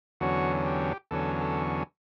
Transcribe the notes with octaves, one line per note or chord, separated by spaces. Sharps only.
E2 D3 F#3 C#4 F#4
G4
E2 D3 F#3 C#4 A4
A4